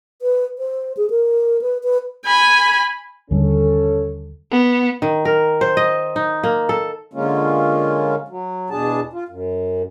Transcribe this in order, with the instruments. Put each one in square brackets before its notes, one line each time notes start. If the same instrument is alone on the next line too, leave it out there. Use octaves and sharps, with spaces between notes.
[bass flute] B4
C5
G#4
A#4
B4
B4
[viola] G#5 B5
[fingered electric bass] D#2 D3 G3 [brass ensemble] C#4 A4
[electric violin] B3
[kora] D#3
A#4
C5
D#5
D#4
A#3
A4
[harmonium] D3 G#3 A#3 C#4 F4
F#3
E2 B2 D4 G#4 A5
F4
F#2